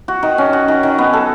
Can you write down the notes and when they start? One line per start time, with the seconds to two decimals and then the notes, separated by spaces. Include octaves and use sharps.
0.08 F#4
0.23 D#3
0.38 C#4
0.53 F#4
0.68 D#3
0.83 D#3
0.98 B3
1.13 A4